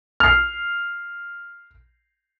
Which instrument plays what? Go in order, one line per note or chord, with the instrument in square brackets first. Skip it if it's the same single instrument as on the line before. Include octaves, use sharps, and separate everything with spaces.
[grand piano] F6 C7